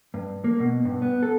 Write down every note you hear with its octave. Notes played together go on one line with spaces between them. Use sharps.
G2
A#3
B2
G2
B3
A4